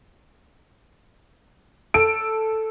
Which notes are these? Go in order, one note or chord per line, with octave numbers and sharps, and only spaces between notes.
A4 D7